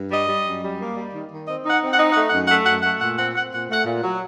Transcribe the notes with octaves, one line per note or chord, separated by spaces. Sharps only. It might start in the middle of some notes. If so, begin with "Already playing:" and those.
Already playing: G2
G3 D#5
G3
F#2
G3
A#3
G3
D#3
D#3
C4 D#5
D#4
F#5
C4
F#5
D#4
F#5
A3
F#2 F#5
A3 F#5
F#2 F#5
A3 F#5
A#2 F#5
C4 F#5
C4 F#5
A#2 F#5
A3 F#5
A#2
F#3